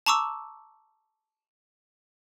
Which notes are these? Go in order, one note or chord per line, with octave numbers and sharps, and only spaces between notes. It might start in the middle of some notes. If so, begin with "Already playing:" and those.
A5 A#5 C#6 D6 E6